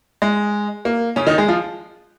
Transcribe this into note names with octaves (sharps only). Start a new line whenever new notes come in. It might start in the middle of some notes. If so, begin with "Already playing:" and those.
G#3
A#3
C#3 C#4
D#3 D#4
G#3 G#4
F3 F4